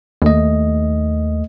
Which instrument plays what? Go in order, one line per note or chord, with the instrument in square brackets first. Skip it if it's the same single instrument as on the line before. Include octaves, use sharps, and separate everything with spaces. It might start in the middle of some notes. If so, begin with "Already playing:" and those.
[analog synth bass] D#2 [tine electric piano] A3 D#5